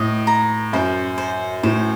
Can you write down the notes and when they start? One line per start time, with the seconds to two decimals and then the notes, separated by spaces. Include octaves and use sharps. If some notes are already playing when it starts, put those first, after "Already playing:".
Already playing: A2 D#5
0.27 A#5
0.73 F#2 C5
1.18 C5
1.63 A2 C5